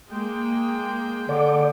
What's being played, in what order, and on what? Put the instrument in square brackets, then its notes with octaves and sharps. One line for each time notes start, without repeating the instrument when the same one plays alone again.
[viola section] G#3 A#3 G5
[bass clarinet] D3 [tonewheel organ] D5